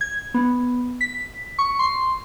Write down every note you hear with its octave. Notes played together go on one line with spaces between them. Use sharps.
G#6
B3
B6
C#6
C6